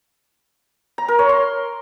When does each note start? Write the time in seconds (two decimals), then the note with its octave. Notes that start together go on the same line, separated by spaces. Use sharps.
0.98 A#5
1.08 A#4
1.19 C#5
1.29 C6